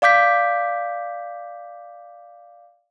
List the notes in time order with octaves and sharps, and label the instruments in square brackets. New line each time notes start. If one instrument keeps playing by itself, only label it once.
[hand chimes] D5 F5 D6 G6 B6